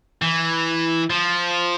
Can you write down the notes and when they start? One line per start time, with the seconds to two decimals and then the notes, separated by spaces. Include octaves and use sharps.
0.22 E3
1.10 F3